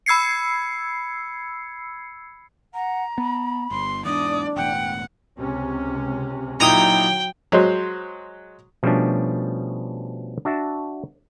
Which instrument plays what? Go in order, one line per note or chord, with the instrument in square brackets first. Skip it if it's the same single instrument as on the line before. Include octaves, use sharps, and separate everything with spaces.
[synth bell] B5 E6 G#6 C7 C#7
[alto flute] F#5 [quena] A#5
[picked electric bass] B3 [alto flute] B5
[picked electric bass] G1 [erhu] C6
[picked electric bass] E2 G#2 [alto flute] D4 [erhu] D5 [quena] D#6
[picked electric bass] E1 E2 A2 [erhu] F#5 [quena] G5
[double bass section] C#2 C3 C#4
[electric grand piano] A#2 D#4 E4 [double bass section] F#3 [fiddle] G5 [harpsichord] A#5 D#6
[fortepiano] F#3 G#3 C5
[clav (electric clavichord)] B2 F3 G3 A3 C#4 D4
D4 F#4 E5 A5